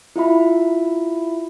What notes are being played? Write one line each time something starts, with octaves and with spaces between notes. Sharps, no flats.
E4 F4 E5 B5